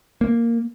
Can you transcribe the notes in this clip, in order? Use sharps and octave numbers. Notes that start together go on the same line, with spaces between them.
A#3